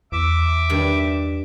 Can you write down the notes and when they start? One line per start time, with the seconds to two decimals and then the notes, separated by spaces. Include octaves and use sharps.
0.12 E2 E5 D6
0.70 G2 D#3